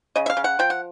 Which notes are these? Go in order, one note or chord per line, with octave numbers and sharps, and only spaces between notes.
C#3 D#5
E5
F5
C#3
F#5
F3 G5
F#5